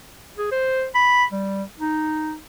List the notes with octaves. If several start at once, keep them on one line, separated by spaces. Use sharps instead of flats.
G#4
C5
B5
G3
D#4